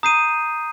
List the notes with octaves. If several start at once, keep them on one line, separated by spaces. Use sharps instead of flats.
A#5 D#6 G6 C7 D#7